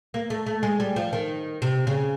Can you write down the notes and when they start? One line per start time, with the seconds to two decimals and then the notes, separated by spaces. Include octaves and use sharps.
0.14 A#3
0.30 A3
0.46 A3
0.63 G#3
0.80 G3
0.96 F3
1.13 D#3
1.62 C3
1.87 C#3